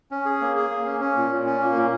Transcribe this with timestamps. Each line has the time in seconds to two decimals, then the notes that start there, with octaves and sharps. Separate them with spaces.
0.11 C#4
0.26 G#4
0.41 A#3
0.56 G#4
0.70 A#3
0.85 C#4
1.01 C#4
1.16 A#2
1.31 A#2
1.46 C#4
1.61 A#3
1.76 A#2